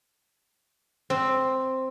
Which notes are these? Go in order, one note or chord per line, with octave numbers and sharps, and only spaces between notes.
C4